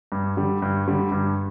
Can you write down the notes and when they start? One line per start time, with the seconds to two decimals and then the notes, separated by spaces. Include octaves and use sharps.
0.12 G2
0.37 D3 G3
0.62 G2
0.88 D3 G3
1.12 G2